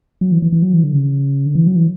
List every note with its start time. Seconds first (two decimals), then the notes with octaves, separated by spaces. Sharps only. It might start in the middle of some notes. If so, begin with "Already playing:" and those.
0.21 F#3
0.32 E3
0.42 E3
0.52 E3
0.62 F#3
0.74 E3
0.84 D3
0.93 C#3
1.46 D3
1.55 E3
1.67 F#3
1.76 E3